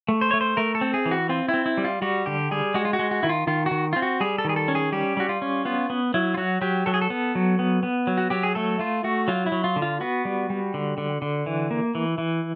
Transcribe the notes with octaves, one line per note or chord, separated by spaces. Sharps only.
A3
C5
A3 C#5
C5
A3 A#4
A4
C4
G#4
E3
F#4
C4 F4
E4
C4
E4
G3
F4
G3 F#4
D3 G4
G3 G#4
G#3 F#4
F4
F#4
G#3
F#4
D#3 E4
F4
D#3 F4
F#4
D#3
C4 F4
F#4
G3 G#4
A4
D#3 G#4
A4
C#4
G#4
G3 G4
G3 F#4
F4
C#4
B3 F4
B3
F#3 E4
F4
F#3 F#4
F#3 G4
F#3 A4
G#4
A4
B3
F#3
B3
B3
F#3
F#4
F#3 G4
G#4
A3 A4
A3 F4
A3 F#4
F#3 F4
E4
F#3
F4
D3
F4
B3 F#4
G3
G3
D3
D3
D3
E3
A#3
E3
E3